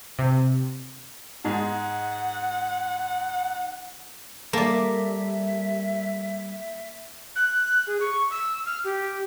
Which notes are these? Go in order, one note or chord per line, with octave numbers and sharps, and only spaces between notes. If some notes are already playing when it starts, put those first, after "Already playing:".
C3
G#2 G#3 F#5
G3 A#3 A4 D5 E5
F#6
G#4
C#6
E6
F6
G4